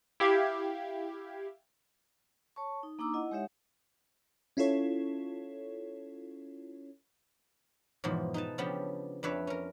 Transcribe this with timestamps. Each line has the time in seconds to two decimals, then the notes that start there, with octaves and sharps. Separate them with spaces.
0.20 E4 G4 F5 G#6
2.56 C#5 A5 C#6
2.83 D#4
2.99 A#3 D4 D#4 A#5 D6 E6
3.14 E4 D#5 F#5
3.31 G#3 D#4 G4 C#5 E5 F#5
4.57 C#4 E4 F4 A4 C#5
8.04 E2 G#2 B2 F3
8.34 D#4 B4 A5
8.58 C#3 F3 B3 D4 G4
9.23 F2 D4 B4 C#5 E5
9.47 C#4 A#4